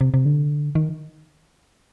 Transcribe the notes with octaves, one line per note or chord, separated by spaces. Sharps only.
C3
C3
D3
D#3